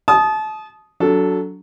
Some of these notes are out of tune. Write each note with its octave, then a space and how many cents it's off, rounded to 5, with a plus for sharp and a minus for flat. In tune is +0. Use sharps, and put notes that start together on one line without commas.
A5 -30 D#6 +0
F#3 +0 D4 -30 A4 +0